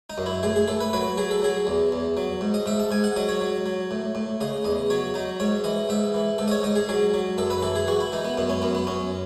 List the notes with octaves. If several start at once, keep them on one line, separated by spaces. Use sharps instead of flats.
D#4
F#2
E4
A2 G#4
G#4
A2 A4
B4
F#3 B4
F#3 G#4
A4
F#3 G#4
E2
E2
F#3
G#2
D#5
G#2 E5
A5
G#2 G#5
F#5
F#3 D#5
C#5
F#3
F#3
A2
A2
C#3 D#5
E2 D#5
F#3 C#5
F#3 D#4
G#2 C#5
E3 D#5
G#2 E5
E3
G#2 A4
D#5
C#5
G#2 D#5
G#4
F#3 G#4
F#3
F#2 A4
B4
E3 A4
G#4
E3 F#4
E4
E3 D#4
B3
F#2 B3
C#4
F#2 B3
B3
F#2 C#4